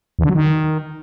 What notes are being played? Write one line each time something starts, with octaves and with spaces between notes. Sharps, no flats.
E2
D3
F#3
D#3